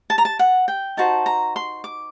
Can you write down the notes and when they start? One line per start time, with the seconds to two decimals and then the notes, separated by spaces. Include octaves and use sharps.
0.10 A5
0.18 A#5
0.25 A5
0.39 F#5
0.68 G5
0.97 D#4 F#4 C5 A5
1.26 A#5
1.56 C6
1.84 D6